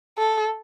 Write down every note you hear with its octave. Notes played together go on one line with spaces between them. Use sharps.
A4